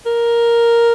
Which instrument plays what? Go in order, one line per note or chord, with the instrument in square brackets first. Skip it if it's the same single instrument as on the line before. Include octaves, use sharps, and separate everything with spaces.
[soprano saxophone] A#4